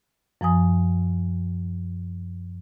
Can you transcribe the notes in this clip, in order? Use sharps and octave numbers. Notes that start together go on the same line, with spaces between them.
F#2 F3 G#5 D#6